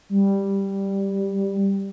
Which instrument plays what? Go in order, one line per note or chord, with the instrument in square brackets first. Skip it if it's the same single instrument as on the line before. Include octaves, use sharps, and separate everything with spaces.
[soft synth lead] G3